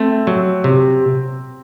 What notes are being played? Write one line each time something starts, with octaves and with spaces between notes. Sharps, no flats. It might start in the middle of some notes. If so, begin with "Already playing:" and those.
Already playing: A3 C4
F#3
C3